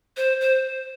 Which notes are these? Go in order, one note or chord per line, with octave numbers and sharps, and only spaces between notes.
C5
C5